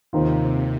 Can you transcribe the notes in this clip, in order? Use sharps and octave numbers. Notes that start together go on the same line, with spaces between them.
D#2 C3 D#3 C4 F4